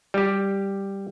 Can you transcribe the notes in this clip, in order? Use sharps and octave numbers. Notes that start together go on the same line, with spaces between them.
G3 G4